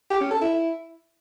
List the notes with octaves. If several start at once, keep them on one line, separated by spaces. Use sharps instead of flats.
G4
C#4
A4
E4